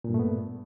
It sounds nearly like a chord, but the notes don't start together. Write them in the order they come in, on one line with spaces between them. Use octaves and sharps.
A#2 G2 A3 B3